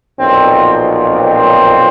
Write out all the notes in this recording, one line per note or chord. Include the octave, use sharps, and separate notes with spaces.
B1 A#2 F3 C4
C4